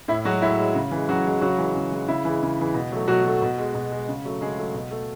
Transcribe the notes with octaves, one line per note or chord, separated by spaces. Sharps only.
A2 E4
F#3 G#3 F#4
A2 E4
G#3
C#3
E3 G#3
C#3 F#3 F#4
E3 G#3
C#3 F#3 F#4
E3 G#3
C#3
E3 G#3
C#3 E4
E3 G#3
C#3
E3 G#3
B2
F#3 A3
B2 F#3 F#4
F#3 A3
B2
G#3
B2
G#3
C#3
F#3 A3
C#3 G#3 G#4
F#3 A3
B2
A3